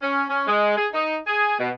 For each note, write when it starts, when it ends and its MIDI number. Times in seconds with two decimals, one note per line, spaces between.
0.01 0.23 61
0.29 0.45 61
0.47 0.76 56
0.76 0.86 68
0.93 1.15 63
1.26 1.54 68
1.58 1.70 47